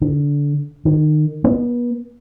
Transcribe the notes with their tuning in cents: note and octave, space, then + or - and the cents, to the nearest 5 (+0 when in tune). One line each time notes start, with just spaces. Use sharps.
D3 -25
D#3 -30
B3 -35